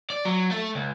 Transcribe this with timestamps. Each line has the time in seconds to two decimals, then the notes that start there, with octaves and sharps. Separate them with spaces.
0.10 D5
0.25 F#3
0.51 A3
0.75 C#2